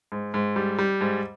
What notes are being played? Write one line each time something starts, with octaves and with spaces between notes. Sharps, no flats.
G#2
G#2
G3
G3
G#2